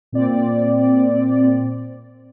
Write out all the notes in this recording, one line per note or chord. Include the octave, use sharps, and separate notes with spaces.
A#2 C4 D5